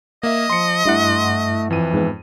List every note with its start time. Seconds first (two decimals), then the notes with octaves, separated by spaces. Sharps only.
0.23 A#3 D#5 E5
0.50 F3 C6 C#7
0.86 G2 A3 E4 F#5
1.70 F2 E3 D#7
1.94 G#2 B3